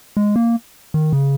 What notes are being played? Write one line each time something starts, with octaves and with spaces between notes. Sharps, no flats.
G#3
A#3
D#3
C#3